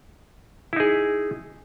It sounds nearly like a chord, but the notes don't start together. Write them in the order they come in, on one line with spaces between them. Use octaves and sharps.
E4 D#4 G#4